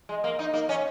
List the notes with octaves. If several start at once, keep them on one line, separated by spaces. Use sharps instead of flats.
G#3
A#3
D#4
A#3
C#4